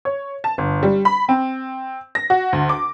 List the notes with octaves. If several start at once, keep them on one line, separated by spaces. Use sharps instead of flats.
C#5
A5
G1
G3
B5
C4
A#6
F#4
D2
D6